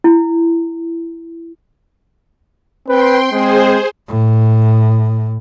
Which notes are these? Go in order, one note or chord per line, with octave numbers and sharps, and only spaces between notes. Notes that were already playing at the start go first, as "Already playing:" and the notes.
E4
C4 B4 G5 C6
G#3 C4 G#4 C5
A2